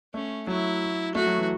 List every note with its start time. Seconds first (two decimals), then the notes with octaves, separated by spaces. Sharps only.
0.14 A3 C#4
0.47 F#3 E4
1.15 A3 F#4
1.26 F#3
1.38 E3